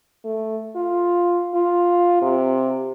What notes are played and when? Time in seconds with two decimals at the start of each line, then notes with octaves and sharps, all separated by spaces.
0.24 A3
0.76 F4
1.54 F4
2.22 C3